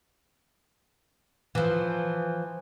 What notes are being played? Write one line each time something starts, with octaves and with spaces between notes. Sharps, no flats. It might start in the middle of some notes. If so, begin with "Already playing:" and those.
E3 F3